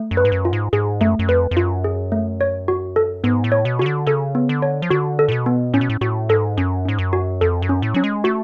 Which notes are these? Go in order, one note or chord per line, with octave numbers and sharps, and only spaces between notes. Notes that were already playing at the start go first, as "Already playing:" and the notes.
Already playing: A3
F#2
B4
G#2
F#2
F4
G#2
G#2 G#4
F#2 A3
F#2
F2 B4
F2
F#2 F4
G#4
A3
C#5
F#4
A4
G#2 B3
A2
C#5
B2
C#3 F#4
D3
C#3 A4
B3
D3
C#5
F3
D3 F#4
A4
A2
B2
B3
A2 C#4
B2
A2
A2 F#4
G#2 A4
F#2 C#4
G#2 C#4
F#2
F#4
F2 A4
F#2
C#4
A2
F#3 C#4
G#3
A3 F#4